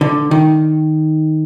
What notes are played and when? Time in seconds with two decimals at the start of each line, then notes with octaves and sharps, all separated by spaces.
0.01 D3
0.31 D#3